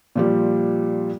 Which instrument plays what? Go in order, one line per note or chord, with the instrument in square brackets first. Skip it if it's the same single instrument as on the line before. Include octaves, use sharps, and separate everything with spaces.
[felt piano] A#2 F3 G3